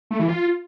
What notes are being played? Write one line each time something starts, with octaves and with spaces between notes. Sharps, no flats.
A3
E3
F4